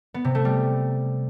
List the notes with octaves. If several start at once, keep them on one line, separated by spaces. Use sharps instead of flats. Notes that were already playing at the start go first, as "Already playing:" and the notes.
B3
C3
A3
G3